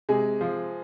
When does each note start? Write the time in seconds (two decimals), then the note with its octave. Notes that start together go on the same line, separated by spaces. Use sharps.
0.09 C3 G#3 G#4
0.41 F3